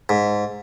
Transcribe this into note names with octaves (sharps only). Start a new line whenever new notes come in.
G#2